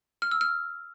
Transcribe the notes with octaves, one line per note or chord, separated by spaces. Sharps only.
F6
E6
F6